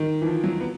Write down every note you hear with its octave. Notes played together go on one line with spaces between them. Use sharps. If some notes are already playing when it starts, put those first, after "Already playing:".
Already playing: D#3
E3
F3
F#3
B3